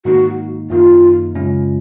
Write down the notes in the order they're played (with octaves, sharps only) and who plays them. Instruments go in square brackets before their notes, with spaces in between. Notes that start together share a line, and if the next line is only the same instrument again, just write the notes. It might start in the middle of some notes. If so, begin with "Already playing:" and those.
[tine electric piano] G#2 D#3 A#3 D#4 [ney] F#4
[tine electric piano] F#2 D#3 A#3 D#4 [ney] F4
[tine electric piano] F#2 C#3 G#3 C#4 F4